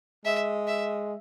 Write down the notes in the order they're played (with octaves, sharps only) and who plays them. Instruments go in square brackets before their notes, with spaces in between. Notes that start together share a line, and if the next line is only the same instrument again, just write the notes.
[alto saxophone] G#3 [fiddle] E5
[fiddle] E5